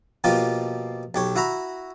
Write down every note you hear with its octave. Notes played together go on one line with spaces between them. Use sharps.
B2 F3 A#3 F4 G4
B1 G4 C#5
E4 F#4 E5 A#5 B5